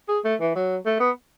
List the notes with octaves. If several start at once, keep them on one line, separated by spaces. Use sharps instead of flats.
G#4
A3
E3
F#3
A3
B3